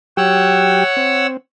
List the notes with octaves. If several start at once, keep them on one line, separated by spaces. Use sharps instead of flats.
F#3 G4 C#5 F#5 G5 E6
C4